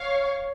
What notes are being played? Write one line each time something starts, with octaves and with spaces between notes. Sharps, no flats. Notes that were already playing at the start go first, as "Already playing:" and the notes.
Already playing: C#5 F5